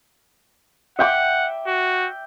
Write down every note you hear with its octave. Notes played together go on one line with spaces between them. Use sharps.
E5 F#5 G5 D6
F#4